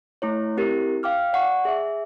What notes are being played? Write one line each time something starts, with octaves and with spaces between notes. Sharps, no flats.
A3 E4 C#5
C4 E4 G4 A#4
F5 G5 D6 F6
D5 F#5 C#6
G#4 E5